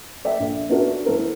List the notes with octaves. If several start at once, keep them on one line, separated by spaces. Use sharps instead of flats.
A4 D5 E5 G5
A#1
B3 C#4 D4 F#4 A#4 E5
E3 A4 A#4 C5